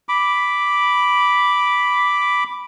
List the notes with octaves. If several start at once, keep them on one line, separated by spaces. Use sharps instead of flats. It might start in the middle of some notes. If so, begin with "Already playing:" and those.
B5 D6